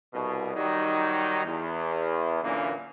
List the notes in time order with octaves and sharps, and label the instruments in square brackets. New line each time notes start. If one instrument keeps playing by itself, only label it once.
[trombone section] C2 B2
D#3 F#3 G3 D#4
E2
F#2 A#2 D3 E3 A#3